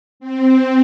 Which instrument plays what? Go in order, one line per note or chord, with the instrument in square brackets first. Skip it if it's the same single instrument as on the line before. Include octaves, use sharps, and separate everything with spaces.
[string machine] C4